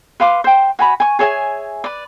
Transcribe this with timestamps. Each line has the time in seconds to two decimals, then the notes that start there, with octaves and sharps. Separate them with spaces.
0.20 B4 F5 C6 D6
0.44 C5 G5
0.79 F#4 G#5 B5
1.00 G#5 C#6
1.19 G#4 C#5 E5 G#5
1.84 B4 D5